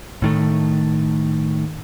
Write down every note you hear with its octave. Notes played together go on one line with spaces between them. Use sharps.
A2 D#3 A3